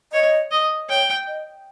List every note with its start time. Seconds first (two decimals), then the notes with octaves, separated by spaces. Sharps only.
0.13 C#5 D#5
0.51 D#5
0.89 C#5 G5
1.27 D#5